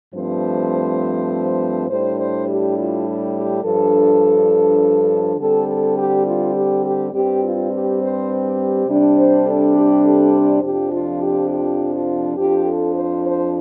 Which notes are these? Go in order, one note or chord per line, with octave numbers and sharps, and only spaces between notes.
G2 F3 A3 C4 C5
A2 G3 D4 C5
C5
G4
F4
G4
G4
G2 F3 D4 A4
D3 G3 C4 A4
A4
G4
F4
G4
G4
G2 G3 C4 G4
F4
G4
C5
G4
C3 G3 D4
C5
A4
G4
A4
C5
F2 C3 F3 D4 G4
F4
G4
G4
F4
F2 F3 D4 G4
A4
C5
C5